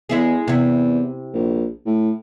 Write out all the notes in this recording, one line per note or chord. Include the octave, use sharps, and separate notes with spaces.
E2 G#3 E4 G#4
E2 C3 E4
A#1
A2